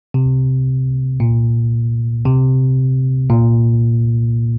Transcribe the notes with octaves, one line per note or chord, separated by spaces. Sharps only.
C3
A#2
C3
A#2